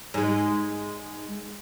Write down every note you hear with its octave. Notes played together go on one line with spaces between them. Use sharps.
G#2 G#3